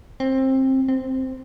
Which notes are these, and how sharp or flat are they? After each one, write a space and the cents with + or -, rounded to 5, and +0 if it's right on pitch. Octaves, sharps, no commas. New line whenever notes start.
C4 +20
C4 -5